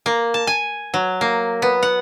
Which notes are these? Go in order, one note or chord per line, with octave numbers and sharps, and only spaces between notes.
A#3
A5
G#5
F#3
A#3
B3
F#5